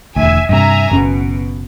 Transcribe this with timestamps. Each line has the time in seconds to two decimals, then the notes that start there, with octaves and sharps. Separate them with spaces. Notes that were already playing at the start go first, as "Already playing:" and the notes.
0.16 E1 D2 E5 G#5
0.49 G2 C3 E5 G#5 A#5
0.92 F#1 B2 C#4